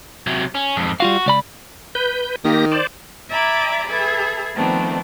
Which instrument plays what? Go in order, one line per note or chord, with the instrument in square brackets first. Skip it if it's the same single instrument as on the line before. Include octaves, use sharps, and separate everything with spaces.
[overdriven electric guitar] C3 F#3
C#4
F2 G#2
[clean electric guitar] G3 F4 F5 [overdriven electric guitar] F#4
[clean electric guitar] C#2 D5 B5
[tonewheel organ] B4 G6
[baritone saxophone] D#3 [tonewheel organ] A#3 G4 A#6
[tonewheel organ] C5 D5
[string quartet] D5 E5 G#5 A#5 B5 D6
G#4 A4 B4 E5
D#3 F3 A3 B3 C4 D4